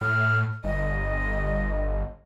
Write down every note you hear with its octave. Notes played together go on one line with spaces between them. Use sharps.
A2 F6
G1 D#5